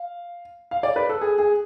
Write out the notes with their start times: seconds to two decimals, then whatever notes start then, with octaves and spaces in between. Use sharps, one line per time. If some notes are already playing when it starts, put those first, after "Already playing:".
Already playing: F5
0.71 F5
0.83 D5
0.96 B4
1.09 A4
1.21 G#4
1.38 G#4